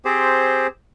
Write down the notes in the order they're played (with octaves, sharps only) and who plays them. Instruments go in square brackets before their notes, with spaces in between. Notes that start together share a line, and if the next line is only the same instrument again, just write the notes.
[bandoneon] C4 G4 G#4 C5